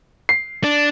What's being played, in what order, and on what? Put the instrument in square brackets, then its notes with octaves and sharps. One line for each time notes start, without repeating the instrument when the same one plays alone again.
[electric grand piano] C7
[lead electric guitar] D4